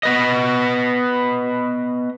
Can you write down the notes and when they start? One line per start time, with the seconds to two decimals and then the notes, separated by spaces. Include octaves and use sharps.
0.03 B3 B4 D#5